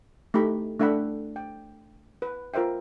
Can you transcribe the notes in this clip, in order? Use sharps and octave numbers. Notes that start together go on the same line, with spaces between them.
A3 D#4 G4 B5
A3 D4 E5 F#5 G5 B5
G5
B4
F4 A#4 C5 E5 G5